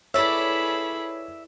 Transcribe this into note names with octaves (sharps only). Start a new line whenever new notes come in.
E4 G#4 A4 B4 C#5 D5 E5 B5